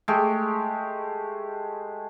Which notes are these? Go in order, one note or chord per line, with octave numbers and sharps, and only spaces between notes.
G#3 A3 G4